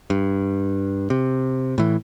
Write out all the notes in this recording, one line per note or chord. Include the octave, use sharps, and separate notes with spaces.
G2
C3
A2 E3